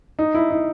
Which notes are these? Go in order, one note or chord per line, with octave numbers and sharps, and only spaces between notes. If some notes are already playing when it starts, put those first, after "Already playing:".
D#4
E4
D#4